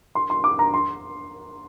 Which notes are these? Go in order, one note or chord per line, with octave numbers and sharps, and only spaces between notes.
C6
C6
D6
A#5
C6